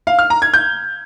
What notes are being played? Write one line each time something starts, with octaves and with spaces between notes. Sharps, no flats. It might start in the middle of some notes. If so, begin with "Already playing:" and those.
F5
F6
A#5
G#6
G6